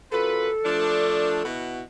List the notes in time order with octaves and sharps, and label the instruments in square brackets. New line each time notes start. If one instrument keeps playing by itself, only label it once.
[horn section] F#2 F4 B4 [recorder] A4
[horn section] F3 A3 D4
B2 E4 F#4